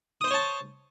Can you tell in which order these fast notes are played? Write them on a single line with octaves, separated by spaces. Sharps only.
D#6 C5 C6 C#5 A5